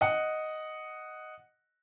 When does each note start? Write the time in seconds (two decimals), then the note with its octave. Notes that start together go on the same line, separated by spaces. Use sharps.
0.01 D#5 F#5